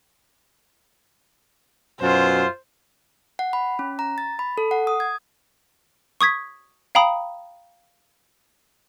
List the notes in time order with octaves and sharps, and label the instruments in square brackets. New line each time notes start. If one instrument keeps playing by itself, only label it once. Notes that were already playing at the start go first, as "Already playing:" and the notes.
[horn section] F#2 B2 F4 [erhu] C5
[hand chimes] F#5
B5
C#4
A#5
A6
B5
A4
F#5
D#6
G#6
[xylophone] C#6 D#6 G#6 B6
F5 G5 A#5 B5 D#6